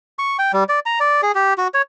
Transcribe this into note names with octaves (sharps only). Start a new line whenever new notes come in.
C#6
G5
G3
D5
A#5
D5
G#4
G4
F#4
C#5